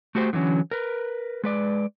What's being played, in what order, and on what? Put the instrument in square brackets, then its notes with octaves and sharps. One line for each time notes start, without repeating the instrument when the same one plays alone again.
[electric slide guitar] A3 F#4 G4 C5
D3 E3 F#3 C#4
A#4 B4
G#3 B4 D5